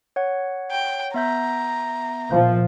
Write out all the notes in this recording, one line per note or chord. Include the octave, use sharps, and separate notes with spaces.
C#5 F#5
G5
B3 E5 A#5 G6
A#2 F3